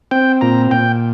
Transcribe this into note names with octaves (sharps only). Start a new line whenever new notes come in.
C4 G5
A#2 A#5
A#2 G5